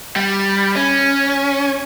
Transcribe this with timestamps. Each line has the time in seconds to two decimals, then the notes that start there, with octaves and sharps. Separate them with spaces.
0.16 G3
0.76 C#4